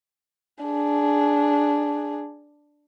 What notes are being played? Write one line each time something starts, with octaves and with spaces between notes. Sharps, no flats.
D4 G#4